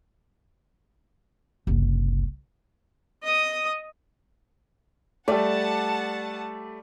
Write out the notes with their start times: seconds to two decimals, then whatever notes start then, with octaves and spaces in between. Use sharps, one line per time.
1.67 F#1 C2
3.23 D#5 D#6
5.28 G3 A3 D5 F#5 A5